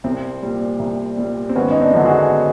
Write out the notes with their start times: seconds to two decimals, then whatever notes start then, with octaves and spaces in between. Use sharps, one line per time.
0.04 C2 C4
0.43 A#2 G3
0.79 C2
1.17 A#2 G3
1.49 C4
1.56 G#1 B3 C#4
1.71 D#4
1.81 C4 D4
1.94 F#2 D3 F#3
2.05 F#4 G#4